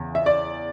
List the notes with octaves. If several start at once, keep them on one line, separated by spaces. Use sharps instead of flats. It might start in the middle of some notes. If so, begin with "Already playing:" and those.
Already playing: E2 C#3
E5
D5